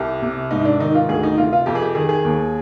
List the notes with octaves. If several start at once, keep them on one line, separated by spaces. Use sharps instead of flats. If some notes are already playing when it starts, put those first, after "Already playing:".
Already playing: C2 G4
C3
G#2 D#4
D4
D#3 D#4
F4
D2 G#4
D#4
C3 F4
F4
F2 G4
G#4
G4
D#3 G#4
G#4
D#2